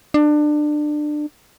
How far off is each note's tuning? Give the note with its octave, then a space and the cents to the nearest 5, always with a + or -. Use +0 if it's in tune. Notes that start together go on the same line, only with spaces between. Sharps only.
D4 +25